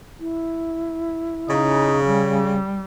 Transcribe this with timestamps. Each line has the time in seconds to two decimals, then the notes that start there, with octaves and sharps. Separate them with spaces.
0.20 E4
1.49 C#3 D#4
2.04 G3